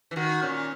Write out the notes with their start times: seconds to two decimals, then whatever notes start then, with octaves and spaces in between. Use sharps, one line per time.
0.11 E3
0.16 D#3 F#4
0.42 A#2 C#4